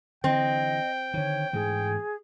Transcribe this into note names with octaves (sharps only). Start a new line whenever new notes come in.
D3 E3 C4 D#5 G5
D3 D#3 C#5
G#2 E3 A3 G#4